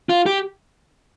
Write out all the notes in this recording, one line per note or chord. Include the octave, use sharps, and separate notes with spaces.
F4
G4